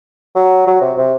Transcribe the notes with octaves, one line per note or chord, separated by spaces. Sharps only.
F#3
F#3
C3
C3